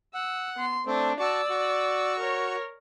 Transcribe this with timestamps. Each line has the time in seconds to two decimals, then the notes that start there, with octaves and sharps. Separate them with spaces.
0.14 F#5 E6
0.56 B3 C6
0.86 A3 C4 D4
1.19 F#4 D5 A5 C#6 E6
1.49 F#4 C#6
2.19 A#4 C#5